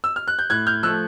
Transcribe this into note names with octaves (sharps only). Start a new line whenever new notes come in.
E6
F6
F#6
G6
A2 F#6 G#6
F6 G6
F3 A3 E6 F#6